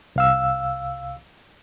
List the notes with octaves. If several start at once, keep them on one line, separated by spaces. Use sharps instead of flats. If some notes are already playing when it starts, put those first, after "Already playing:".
C2 F5 E6